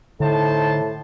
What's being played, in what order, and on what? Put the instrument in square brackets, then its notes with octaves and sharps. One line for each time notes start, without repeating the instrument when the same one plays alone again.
[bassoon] A2 [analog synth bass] D3 [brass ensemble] D#4 C5 A5